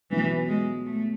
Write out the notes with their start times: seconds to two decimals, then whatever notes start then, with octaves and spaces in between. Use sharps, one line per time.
0.10 C#2 B2 E3 F#3
0.48 G#3
0.86 A3